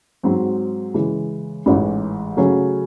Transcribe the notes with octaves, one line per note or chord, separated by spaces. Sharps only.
G#2 F#3 C4
C#3 E3 G#3
A1 G#2 E3
C#3 F#3 A3 C#4